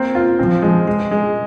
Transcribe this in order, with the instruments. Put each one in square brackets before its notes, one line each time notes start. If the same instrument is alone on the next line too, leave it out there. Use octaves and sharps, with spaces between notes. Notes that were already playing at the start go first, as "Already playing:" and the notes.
Already playing: [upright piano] A#3 C4
F4
[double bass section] F3 [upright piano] C4
[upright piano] G#3
G#3
G#3